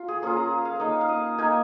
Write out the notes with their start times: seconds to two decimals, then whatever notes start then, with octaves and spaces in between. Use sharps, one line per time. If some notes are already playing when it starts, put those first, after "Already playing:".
Already playing: F4
0.08 G#4
0.22 A#3 C#4 F4 G#4
0.37 A#5
0.65 F5
0.80 A#3 D#4 D#5
1.01 F5
1.09 D#5
1.38 A#3 D#4 G#5